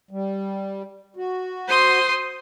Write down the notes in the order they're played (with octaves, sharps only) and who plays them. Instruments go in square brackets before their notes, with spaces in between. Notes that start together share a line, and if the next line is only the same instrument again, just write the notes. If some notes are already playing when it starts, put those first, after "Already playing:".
[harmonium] G3
F#4
[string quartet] C5 C6 D#6